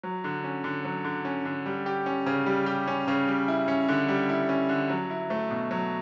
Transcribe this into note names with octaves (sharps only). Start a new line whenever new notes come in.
F#3
D3
C#4
D3
F#3
D3
C#4
D3
G3
G4
C#4
C#3
G3
G4
C#4
C#3
G3
E4
C#4
D3
G3
E4
C#4
D3
F#3
E4
A3
B2
F#3